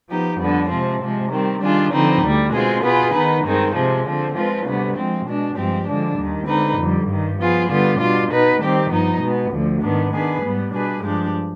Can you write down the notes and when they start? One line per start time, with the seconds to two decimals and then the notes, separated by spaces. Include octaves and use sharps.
0.09 F3 B3 D#4 G4
0.39 F2 D3 G3 B3
0.70 C3 F3 G#3 C4
1.01 C3 F3 G#3
1.31 D#3 G3 C4
1.61 D#3 G3 D4 F4 G#4
1.92 D3 F3 C4 D#4 B4
2.22 D2 D3 G3
2.52 B2 G#3 C4 F4 G#4
2.83 B2 B3 F4 G#4 B4
3.13 D#3 B3 D#4 B4
3.44 G2 D#3 G#3 C4 D#4
3.74 C3 F3 G#3 C4
4.05 D3 F3 C4
4.35 F3 G#3 C4 F4 B4
4.66 D2 C3 G3 B3
4.96 F3 G#3 C4
5.26 B2 G#3 D4
5.56 G2 F3 G#3 C4 G4
5.87 D3 F3 G#3 D4
6.17 D#2 D#3 G3
6.47 D3 G#3 C4 D#4 B4
6.78 F2 D3 G3
7.08 G2 D#3 G3
7.38 F3 B3 F4 G#4
7.69 D3 G3 B3 F4
7.99 B2 G3 D4 F4
8.30 B2 B3 D#4 B4
8.61 D#3 G3 C4 G4
8.90 G2 F3 B3 D#4
9.21 B2 G#3 B3
9.51 D2 D3 F3
9.81 G#2 D#3 B3 D4
10.12 D#3 B3 D4 G#4 B4
10.42 G#2 G3 B3
10.73 B2 G3 D4 G#4 B4
11.03 G2 F3 G#3 D4 G4